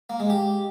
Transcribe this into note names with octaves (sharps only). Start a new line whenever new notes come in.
A#3
G#3
G4